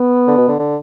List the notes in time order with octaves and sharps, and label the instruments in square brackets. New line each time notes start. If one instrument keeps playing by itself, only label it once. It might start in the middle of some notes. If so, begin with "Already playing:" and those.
Already playing: [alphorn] B3
[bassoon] D3
B2
D3
D3